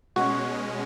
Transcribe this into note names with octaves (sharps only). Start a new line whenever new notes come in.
B2 G#3 C#4 F#4